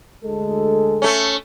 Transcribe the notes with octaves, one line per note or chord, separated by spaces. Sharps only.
D2 G#3 A4
A3 C#4